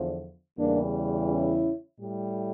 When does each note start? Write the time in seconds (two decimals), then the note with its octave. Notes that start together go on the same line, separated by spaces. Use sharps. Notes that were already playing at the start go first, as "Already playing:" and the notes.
Already playing: E2 D3 F3
0.59 E2 C#3 E3 G3 A#3 D4
1.28 C#4 E4
1.98 A2 G3